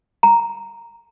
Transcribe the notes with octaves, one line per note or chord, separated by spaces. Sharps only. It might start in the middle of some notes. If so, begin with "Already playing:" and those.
A#5